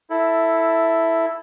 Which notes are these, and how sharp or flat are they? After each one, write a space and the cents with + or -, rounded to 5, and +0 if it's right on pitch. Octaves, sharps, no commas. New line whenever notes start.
E4 +0 A4 +5